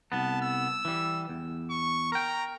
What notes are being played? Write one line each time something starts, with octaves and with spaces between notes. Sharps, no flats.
C2 B3 A5
E6
E3 G3
E2
C#6
A#4 G5 A#5